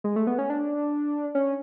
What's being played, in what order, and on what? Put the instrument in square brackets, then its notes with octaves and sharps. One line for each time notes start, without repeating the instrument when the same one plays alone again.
[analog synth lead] G#3
A3
B3
C#4
D4
C#4